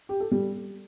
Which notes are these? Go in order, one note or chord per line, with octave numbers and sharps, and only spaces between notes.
G4
A4
G3